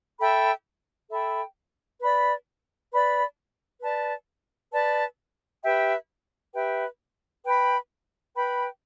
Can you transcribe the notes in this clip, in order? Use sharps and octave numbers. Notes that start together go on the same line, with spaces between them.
A4 E5 G5 B5
A4 E5 G5 B5
B4 D5 B5
B4 D5 B5
B4 D5 A5
B4 D5 A5
G4 B4 E5 G5
G4 B4 E5 G5
B4 G5 B5
B4 G5 B5